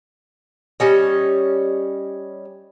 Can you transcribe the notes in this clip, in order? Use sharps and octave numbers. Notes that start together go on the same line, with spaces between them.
G3 C#4 D#5